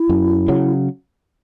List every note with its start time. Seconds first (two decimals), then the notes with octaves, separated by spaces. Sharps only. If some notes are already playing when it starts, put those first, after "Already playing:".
Already playing: E4
0.09 F#2
0.48 C#3 F#3